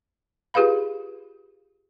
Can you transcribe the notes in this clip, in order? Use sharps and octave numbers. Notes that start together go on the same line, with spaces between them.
F4 G4 G#4 B4 F5 B5